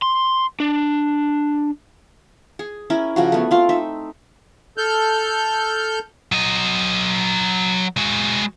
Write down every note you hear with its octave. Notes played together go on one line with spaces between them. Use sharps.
C6
D4
G#4
C#4 E4 A#4
C#3 F3 F#4
A3 B3
C4 F4 F5
D#4 E5
A4 F6 G6
F#3 D#5
G#3 F#4